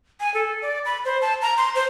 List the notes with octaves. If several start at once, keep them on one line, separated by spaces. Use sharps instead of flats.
G#5
A4
D5
B5
C5
A5
A#5
C6
C5